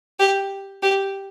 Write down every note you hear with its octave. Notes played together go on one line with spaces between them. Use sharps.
G4
G4